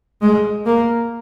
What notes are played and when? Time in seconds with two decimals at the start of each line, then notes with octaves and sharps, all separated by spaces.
0.22 G#3
0.66 A#3